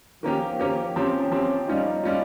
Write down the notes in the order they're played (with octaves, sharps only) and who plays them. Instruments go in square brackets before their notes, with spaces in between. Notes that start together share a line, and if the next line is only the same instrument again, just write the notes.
[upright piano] D#3 A#3 C#4 G4 [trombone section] F3
[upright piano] D#3 A#3 C#4 G4
[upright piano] F3 C4 G4 [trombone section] C#4
[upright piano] F3 C4 G4
[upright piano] G3 C#4 F4 [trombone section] D#4
[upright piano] G3 C#4 F4